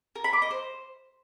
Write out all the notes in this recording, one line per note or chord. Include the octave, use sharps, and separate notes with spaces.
A#4
B5
D6
D#5
C5